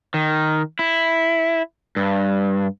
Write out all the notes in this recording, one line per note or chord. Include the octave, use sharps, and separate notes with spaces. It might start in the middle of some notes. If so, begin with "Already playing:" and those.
D#3
E4
G2